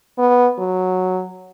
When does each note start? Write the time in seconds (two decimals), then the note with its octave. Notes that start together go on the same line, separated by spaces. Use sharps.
0.18 B3
0.59 F#3